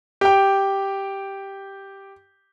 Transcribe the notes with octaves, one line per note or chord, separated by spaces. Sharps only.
G4 G5